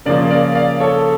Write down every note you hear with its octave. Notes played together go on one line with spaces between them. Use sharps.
C#3 F3 A#3 A#4 D5
A#4 D5
D5 F5
A4 C#5